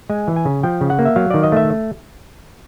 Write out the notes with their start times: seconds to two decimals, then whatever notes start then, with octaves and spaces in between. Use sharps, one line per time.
0.10 G#3 G#5
0.28 E3
0.36 G#5
0.45 C#3
0.63 F3 G5
0.81 C#3
0.90 F#5
0.99 A#3
1.05 E5
1.16 F#3 F5
1.30 D#3 D5
1.43 D#5
1.52 A3 E5